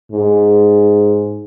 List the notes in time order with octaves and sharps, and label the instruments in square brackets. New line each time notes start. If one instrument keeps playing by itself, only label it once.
[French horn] G#2